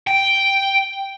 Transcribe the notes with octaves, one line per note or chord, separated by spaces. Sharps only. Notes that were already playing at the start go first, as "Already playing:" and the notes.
G5